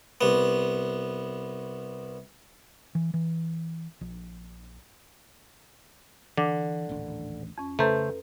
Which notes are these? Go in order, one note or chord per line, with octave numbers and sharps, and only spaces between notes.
C2 B3
E3
E3
A#1
D3 E3 D6
D#1 A1 D4
F2 C#4
C#3 A3 A4 B4 C5 A#5